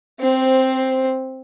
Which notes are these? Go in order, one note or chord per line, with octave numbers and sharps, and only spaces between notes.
C4 C5